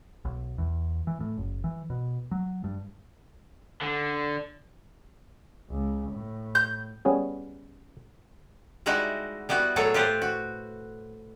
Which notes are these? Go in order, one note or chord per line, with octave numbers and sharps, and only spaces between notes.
B1
E2
E3
A2
F#1
E3
B2
F#3
G2
D3
C#2
A2
G6
G3 B3 C#4 G#4
G3 G#3 D#4 E4 F#4
G3 B3 E4 F#4
A2 F#3 G#4 A4 C#5
F4 G4 B4 C5
F#4